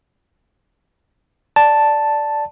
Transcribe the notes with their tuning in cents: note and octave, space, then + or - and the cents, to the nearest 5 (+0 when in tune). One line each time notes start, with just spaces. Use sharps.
D5 +0 A5 +0